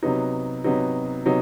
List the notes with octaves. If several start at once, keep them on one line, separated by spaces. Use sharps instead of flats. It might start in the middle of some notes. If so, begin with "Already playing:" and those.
C3 F#3 B3 D#4
C3 F#3 B3 D#4
C3 F#3 B3 D#4